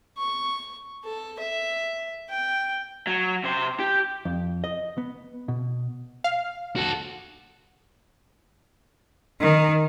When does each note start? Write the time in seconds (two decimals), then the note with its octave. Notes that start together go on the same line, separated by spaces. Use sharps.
0.18 C#6
1.04 A4
1.39 E5
2.30 G5
3.07 F#3
3.44 C3 C5
3.79 G4
4.25 F2
4.64 D#5
4.98 B3
5.48 B2
6.24 F5
6.76 F#4 A4
9.41 D#3